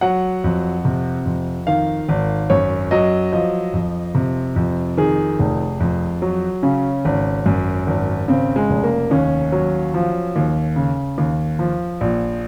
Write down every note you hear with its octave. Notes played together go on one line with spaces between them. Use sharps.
F#3 F#5
F2
C3
F2
D#3 F5
G#1
F#2 C#5
F#3 D#5
F3 D#5
F2
C3
F2
D#3 G#4
F1
F2
F#3
C#3 C#4
G#1
F#2
G#1
C#3 C4
G#3
F1
A#3
D#2 C#4
F#3
F3
D#2
C#3
D#2
F3
A#1